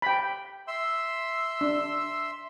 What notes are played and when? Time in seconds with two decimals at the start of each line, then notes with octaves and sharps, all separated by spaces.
0.02 G5 B5
0.68 E5 C6 E6
1.61 D4